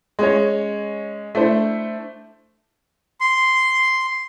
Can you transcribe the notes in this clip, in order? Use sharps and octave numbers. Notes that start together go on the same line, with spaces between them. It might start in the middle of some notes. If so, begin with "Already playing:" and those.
G#3 C#4 C#5
A3 D4 E4 C5
C6